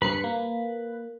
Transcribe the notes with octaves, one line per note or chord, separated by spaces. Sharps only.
G2 B4 B5 C7 C#7
A#3